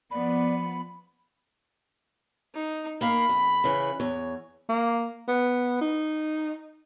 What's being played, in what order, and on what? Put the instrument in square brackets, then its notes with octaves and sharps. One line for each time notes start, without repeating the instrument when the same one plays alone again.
[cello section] F3 B3 [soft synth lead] D5 [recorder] B5
[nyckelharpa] D#4
[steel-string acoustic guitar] A#3 A#4 F5 [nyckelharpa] B5
[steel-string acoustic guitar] F2
C#3 E3 C#4
E2 C#5
[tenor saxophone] A#3
B3
D#4